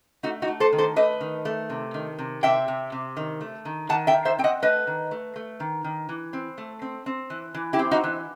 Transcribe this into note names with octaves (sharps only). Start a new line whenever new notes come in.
A3 D#4 F#4
D#4 F#4
A3
A4 C5
D#3
A4 C5
A3 B4 D#5
D#3
A3
C3
D#3
C3
C3 E5 G5
C3
C3
D#3
A3
D#3
D#3 F#5 A5
E5 G5
D#3
C5 E5
C4 G5
D#5 F#5
A3 B4 D#5
D#3
A3
A3
D#3
D#3
E3
C4
A3
C4
C4
E3
E3
E4 G4
C4
D#4 F#4
E3